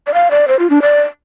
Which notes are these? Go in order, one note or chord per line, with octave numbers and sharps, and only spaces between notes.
D5
F5
D5
C5
F4
D4
D5